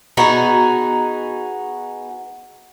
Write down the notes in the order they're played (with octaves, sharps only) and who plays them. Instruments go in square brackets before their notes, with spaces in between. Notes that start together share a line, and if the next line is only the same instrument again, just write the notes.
[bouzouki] B3 D#4 F#4 G#4